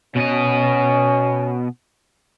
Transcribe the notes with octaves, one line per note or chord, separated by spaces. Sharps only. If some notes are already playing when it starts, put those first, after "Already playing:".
B2 C#4 D#5